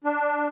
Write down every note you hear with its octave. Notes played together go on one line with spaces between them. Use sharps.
D4